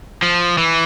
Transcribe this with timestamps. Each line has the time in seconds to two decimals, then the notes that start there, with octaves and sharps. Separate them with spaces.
0.22 F3
0.58 E3